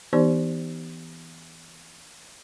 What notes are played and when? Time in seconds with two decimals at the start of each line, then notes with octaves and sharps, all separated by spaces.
0.13 E3 B3 D#4 G4 C5 D5